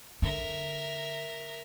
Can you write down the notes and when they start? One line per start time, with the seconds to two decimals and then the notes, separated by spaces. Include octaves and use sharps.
0.22 D3 A#4 E5